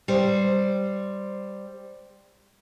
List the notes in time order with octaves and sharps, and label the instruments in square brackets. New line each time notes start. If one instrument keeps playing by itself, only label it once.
[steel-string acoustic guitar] G3 C5